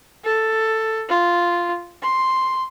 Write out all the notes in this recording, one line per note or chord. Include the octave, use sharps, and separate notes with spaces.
A4
F4
C6